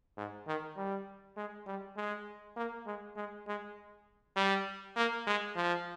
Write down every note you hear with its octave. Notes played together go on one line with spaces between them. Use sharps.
G#2
D#3
G3
G#3
G3
G#3
A#3
G#3
G#3
G#3
G3
A#3
G#3
F3